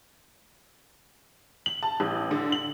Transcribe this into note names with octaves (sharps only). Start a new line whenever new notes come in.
F#7
A5
A1
D3
F#7